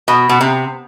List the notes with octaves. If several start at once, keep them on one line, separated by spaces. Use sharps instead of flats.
B2
B2
C3